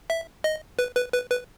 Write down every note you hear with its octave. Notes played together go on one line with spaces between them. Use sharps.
E5
D#5
B4
B4
B4
B4